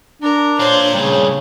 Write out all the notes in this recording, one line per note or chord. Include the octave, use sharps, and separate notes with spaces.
D4 A#4
F4 A#4 C5 C#5
G2 A#2 C#3